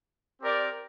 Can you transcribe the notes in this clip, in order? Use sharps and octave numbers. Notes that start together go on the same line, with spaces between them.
C4 G4 A#4 D5